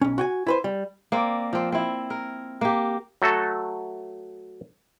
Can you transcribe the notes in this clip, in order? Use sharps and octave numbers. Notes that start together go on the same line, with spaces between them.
B1 C#4
F#4 G5 G#5
E4 B4 C5
G3
A#3 C4 D5
F3 C4
C4 E4
A#4
A#3 G4
F#3 A3 F#4 A4